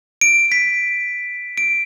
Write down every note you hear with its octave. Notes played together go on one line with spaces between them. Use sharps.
D7
B6
D7